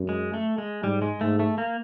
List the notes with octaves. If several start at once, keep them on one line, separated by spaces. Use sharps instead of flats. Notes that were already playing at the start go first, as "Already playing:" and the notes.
Already playing: F#2
G#3
A3
G#3
G#2 G3
G#3
G#2 A3
A3
A#3